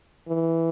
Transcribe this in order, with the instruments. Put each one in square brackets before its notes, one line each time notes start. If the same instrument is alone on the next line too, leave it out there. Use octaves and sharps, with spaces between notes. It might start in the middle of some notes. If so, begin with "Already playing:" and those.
[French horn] E3